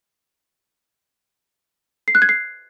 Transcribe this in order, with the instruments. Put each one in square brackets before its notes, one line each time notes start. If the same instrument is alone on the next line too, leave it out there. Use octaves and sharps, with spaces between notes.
[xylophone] C7
F#6
G#6
C7